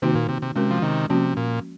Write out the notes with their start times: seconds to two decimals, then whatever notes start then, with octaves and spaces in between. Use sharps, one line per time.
0.02 C3 D#3 A#3 D#4 F#4
0.15 A#2
0.29 C3
0.42 C3
0.55 C3 G#3 C#4 F#4 A#4
0.71 F3
0.82 C3 D#3
1.09 C3 F3 A#3 C#4 F#4
1.36 A#2